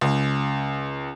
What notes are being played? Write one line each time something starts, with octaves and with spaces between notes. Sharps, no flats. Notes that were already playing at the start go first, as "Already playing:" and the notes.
C#2